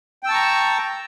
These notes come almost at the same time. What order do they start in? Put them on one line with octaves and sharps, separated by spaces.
G5 E6 A5 C#6 A#5